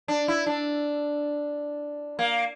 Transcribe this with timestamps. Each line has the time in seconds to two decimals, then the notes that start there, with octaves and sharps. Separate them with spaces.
0.08 D4
0.28 E4
0.47 D4
2.19 A#3